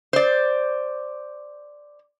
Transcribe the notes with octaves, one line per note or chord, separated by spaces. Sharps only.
C5 D5